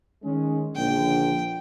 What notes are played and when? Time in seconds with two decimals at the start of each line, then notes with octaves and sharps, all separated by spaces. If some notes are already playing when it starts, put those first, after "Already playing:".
0.23 D#3 G#3 C#4
0.76 A#1 D3 G5